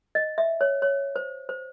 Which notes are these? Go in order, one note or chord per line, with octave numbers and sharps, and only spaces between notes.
D#5
E5
C#5
C#5
C5
C5